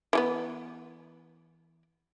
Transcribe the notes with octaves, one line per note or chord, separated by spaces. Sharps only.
E3 G#3 B3